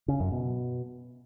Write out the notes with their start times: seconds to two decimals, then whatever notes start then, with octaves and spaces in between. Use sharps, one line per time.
0.08 C#3
0.20 F#2
0.32 B2